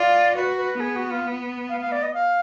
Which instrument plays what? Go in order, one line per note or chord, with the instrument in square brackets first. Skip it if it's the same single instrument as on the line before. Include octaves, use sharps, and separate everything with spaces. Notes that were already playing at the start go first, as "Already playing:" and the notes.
Already playing: [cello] F4 [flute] D5
[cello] F#4 [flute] B4
[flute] B4
[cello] B3 [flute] G#4
[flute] F#4
F4
F5
F5
D5
D#5
F5